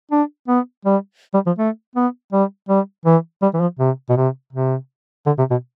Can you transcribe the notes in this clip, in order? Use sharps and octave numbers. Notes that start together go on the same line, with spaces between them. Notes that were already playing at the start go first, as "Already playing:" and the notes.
D4
B3
G3
G3
F3
A3
B3
G3
G3
E3
G3
E3
F3
C3
B2
C3
C3
D3
C3
B2